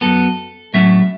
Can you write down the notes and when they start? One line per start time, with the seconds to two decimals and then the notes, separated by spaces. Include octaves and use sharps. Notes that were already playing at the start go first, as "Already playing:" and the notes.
0.01 F#2 F#3 B3 A4
0.74 A2 F#3 A3 C#4 E5